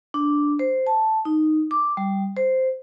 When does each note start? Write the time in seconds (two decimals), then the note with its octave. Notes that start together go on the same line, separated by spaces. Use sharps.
0.14 D4
0.59 C5
0.87 A5
1.25 D#4
1.71 D6
1.97 G3
2.37 C5